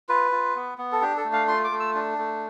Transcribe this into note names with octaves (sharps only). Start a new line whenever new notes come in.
F4 B4
F4
B3
B3
A4
D4 G4
A4
A3
F5
F4 C6
D6
A3
E6
D4
A3